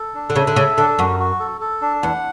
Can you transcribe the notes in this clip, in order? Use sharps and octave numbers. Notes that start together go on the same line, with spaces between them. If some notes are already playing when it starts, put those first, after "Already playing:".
Already playing: A4
D4
D3
C#3 E5
D3
C#3 A4
D3 D4
F#2 F#4
F#4
A4
A4
D4
E2 F#5